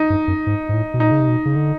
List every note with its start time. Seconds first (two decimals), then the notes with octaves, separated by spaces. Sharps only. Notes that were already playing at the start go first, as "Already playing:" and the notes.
Already playing: D#4
0.10 G2
0.28 F#2
0.47 G#2
0.69 G#2
0.74 A2
0.94 B2
1.00 A#2 D#4
1.11 C#3
1.20 C3
1.28 B2
1.46 C#3
1.56 D3